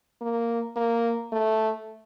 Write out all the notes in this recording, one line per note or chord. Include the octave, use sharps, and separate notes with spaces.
A#3
A#3
A3